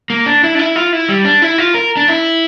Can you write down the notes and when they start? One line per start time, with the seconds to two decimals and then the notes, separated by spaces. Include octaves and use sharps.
0.10 A#3
0.26 D4
0.44 E4
0.55 D4
0.59 E4
0.76 F4
0.93 E4
1.09 G3
1.25 D4
1.42 E4
1.58 F4
1.75 A#4
1.97 D4
2.08 E4